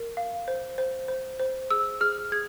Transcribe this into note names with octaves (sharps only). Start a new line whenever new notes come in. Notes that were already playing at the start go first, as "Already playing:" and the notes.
Already playing: A#4
F5
C5
C5
C5
C5
G#4 E6
G#4 F6
G#4 G#6